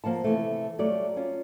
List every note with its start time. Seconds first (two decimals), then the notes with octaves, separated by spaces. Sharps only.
0.04 F3 A#3 F#5 A5
0.24 C3 E3 A3
0.79 F#3 G3 A3 D5
1.16 C#4 F4